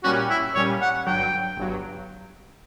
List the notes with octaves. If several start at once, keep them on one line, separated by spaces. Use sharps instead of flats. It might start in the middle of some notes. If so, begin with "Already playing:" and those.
A#2 G3 C#4 F#4
E4
A#2 G3 C#4 C#5
F#5
G1 G2 F#3 G5
G1 G2 F#3